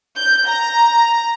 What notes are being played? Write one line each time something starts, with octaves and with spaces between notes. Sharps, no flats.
G6
A#5